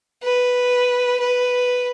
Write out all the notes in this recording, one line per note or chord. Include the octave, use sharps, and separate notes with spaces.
B4
B4